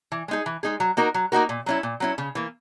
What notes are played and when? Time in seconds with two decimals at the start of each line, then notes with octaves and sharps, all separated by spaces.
0.12 E3
0.28 G#3 D#4 G#4
0.46 E3
0.63 G#3 D#4 G#4
0.80 F#3
0.97 A#3 D#4 F#4 A#4
1.14 F#3
1.32 A#3 D#4 F#4 A#4
1.49 A#2
1.66 F#3 C#4 E4
1.83 A#2
2.00 F#3 C#4 E4
2.18 C#3
2.35 E3 A#3